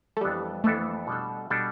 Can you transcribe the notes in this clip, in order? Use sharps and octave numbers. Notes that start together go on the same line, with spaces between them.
A3
F2 E3 G3 B3 D4 A4
F2 E3 A3 B3 D4 A4
B2 G3 D4 A4
B2 G3 D4 A4